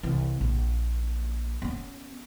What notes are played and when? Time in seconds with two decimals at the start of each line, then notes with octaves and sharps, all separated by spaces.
0.03 C2 E3
0.41 A#1
1.62 B3 C#4